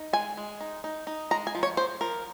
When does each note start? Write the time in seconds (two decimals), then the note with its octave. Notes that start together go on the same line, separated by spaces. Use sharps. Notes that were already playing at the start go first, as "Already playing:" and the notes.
Already playing: D#4
0.13 G#3 G#5
0.37 G#3
0.61 D#4
0.84 D#4
1.07 D#4
1.31 G#3 A#5
1.47 G#5
1.55 F3
1.63 C#5
1.77 F3 C5
2.01 F3 A#4